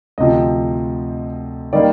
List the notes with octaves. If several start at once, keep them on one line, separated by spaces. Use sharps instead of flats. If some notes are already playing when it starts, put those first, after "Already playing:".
D2 C3 F3 D#5
D#3 G3 A#3 D5